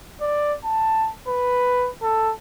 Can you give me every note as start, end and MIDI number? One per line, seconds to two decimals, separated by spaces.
0.21 0.54 74
0.64 1.09 81
1.28 1.90 71
2.02 2.32 69